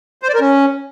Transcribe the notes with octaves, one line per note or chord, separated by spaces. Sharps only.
C5
D5
A#4
C#4